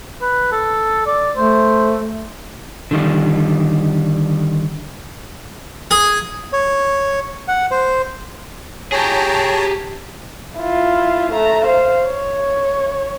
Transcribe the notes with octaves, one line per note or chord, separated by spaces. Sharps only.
B4
A4
D5
A3 C5
D3 D#3 G3
G#4
C#5
F#5
C5
G4 G#4 C#5 A5 A#5
E4 F4
A3 A#5
C5 F5
C#5